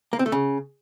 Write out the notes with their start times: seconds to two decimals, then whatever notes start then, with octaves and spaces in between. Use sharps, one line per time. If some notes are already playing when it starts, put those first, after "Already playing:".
0.13 A#3
0.19 C4
0.26 A3
0.32 C#3